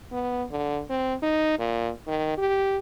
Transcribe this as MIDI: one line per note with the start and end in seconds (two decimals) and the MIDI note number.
0.12 0.44 59
0.51 0.80 50
0.89 1.15 60
1.22 1.55 63
1.59 1.90 46
2.07 2.35 51
2.38 2.78 67